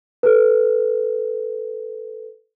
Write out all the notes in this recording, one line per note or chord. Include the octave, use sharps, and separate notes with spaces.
A4 B4